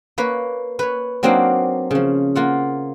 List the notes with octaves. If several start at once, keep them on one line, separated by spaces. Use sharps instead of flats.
A#3 B4 C#5
B4 C#5
F#3 A#3 C4 D4 D#4 F5
C#3 F3
A#3 F4 F#5